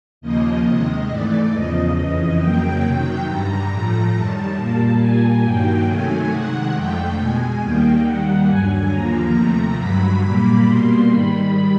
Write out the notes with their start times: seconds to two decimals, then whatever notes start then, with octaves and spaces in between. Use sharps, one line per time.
0.21 D#2 C#3 F3 A#3 D#5
0.64 C3 D#3 G#3
1.08 G#2 E3 A3 D5
1.51 E2 C#3 F3 D#5
1.96 F2 C#3 E3
2.39 F2 C#3 F#3 A#3 G5
2.82 C3 D#3 F#3 G5
3.26 G2 D3 G3 A#5
3.69 A2 F3 A3
4.13 F#2 D#3 G3 A5
4.56 A#2 G3 A#3
5.00 A#2 G3 A#3 G#5
5.43 G2 D#3 F#3 A#3 G5
5.86 C3 D#3 F#3 A3 G#5
6.30 C3 D#3 G#3 F#5
6.74 F2 D3 F3 A3 G5
7.16 B2 G#3 G#5
7.60 D#2 D#3 G3 A#3 G5
8.04 D#2 D#3 G3 A#3 F#5
8.47 G2 D3 F#3 G#5
8.90 D#2 D3 F3 A#3 A#5
9.34 C3 F3 A3
9.78 G2 D3 F#3 B5
10.21 A#2 G3 A#3
10.65 B2 G3 A#3 C6
11.08 G#2 D#3 G3 B5